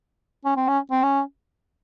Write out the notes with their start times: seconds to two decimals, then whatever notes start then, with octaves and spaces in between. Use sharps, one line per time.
0.45 C#4
0.57 C4
0.68 C#4
0.91 C4
1.03 C#4